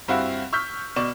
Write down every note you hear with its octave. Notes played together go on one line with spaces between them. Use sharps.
G2 C4 E4 F#4 F5
C#6 E6 F6 G6 B6
B2 D5 C#6 E7